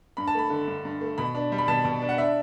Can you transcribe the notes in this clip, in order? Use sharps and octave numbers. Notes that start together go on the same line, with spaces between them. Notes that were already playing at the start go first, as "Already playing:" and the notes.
G2 B5
A5
A3 B5
D3
G2
G2
A3
B2 B5
D4
G3
B5
B2 A5
B2
D4
F#5
D4 E5